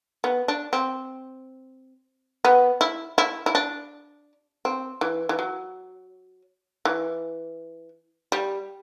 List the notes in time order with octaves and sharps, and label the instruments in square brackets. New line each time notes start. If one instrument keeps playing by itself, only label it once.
[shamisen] B3
D4
C4
B3
E4
E4
E4
D4
C4
E3
E3
F#3
E3
G3